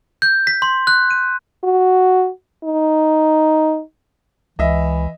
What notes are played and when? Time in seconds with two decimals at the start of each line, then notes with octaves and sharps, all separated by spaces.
0.22 G6
0.47 B6
0.62 C6
0.87 F#6
1.11 D#7
1.64 F#4
2.64 D#4
4.59 C#2 E3 D#5 E5